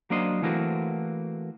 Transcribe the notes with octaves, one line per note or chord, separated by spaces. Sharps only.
F#3 A#3 D4 C5 D#5
E3 A3 A#3 C4 F#4